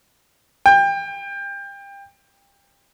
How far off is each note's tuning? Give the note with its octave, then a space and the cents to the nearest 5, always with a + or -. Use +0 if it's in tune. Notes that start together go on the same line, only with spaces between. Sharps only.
G5 +25